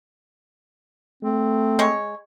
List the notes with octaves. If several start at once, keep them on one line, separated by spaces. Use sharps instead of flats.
A3 C4
G#3 C#5